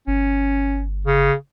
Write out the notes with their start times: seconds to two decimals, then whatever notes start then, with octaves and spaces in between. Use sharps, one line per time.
0.07 G1 C#4
1.06 C#3